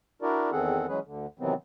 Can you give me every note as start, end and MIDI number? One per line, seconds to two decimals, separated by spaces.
0.22 0.51 62
0.22 0.51 64
0.22 0.51 66
0.22 0.51 70
0.22 0.51 74
0.52 0.86 40
0.52 0.86 51
0.52 0.86 60
0.52 0.86 68
0.52 0.86 69
0.52 0.86 78
0.88 0.99 52
0.88 0.99 54
0.88 0.99 56
0.88 0.99 61
0.88 0.99 68
0.88 0.99 71
1.05 1.26 38
1.05 1.26 50
1.39 1.54 48
1.39 1.54 51
1.39 1.54 52
1.39 1.54 54
1.39 1.54 59
1.39 1.54 60